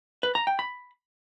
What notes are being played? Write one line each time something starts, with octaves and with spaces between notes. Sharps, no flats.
B4
A#5
G5
B5